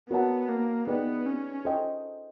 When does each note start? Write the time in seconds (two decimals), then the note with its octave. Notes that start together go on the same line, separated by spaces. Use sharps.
0.10 B3 F#4 A#4 C#5 F#5 A5
0.49 A#3
0.87 B3 D#4 G#4 B4 D5 G5
1.26 C#4
1.65 A4 C5 D#5 G5